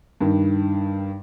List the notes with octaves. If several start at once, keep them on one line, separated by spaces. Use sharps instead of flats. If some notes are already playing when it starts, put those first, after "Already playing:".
G2 D#3